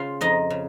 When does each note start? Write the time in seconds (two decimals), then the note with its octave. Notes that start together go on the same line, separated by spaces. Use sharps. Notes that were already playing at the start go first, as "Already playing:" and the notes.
Already playing: C#3 F4 F5
0.21 F2 D#4 D#5
0.50 C#3